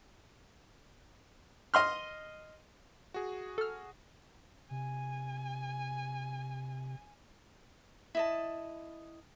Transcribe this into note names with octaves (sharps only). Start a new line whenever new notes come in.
D#5 C6 F6
F#4 G#4
A4 F6
C3 G#5
E4 D#5 A5